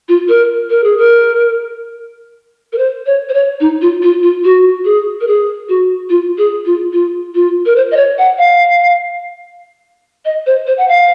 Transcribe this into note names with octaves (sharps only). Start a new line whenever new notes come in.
F4
A#4
A#4
G#4
A#4
A#4
C5
C#5
C5
C#5
D#4
F4
F4
F4
F#4
G#4
A#4
G#4
F#4
F4
G#4
F4
F4
F4
A#4
C5
D#5
C#5
F#5
F5
D#5
C5
C5
F#5
F5